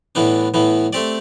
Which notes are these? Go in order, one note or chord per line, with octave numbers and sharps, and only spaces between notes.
A2 E3 B3 D4
A2 E3 B3
A3 C4 G4 D5